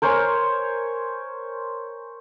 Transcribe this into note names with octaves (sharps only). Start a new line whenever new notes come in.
A#4 C5 C#5 G#5